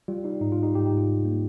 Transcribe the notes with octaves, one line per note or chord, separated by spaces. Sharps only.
G3 F4
G3 D#4
G#2 D#4
F4
G3
D#4 G4
G#2 D#4 G4
D#4 G4
G#2
F4
G3
A#3